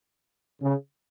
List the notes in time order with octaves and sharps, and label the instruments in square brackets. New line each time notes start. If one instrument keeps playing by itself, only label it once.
[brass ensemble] C#3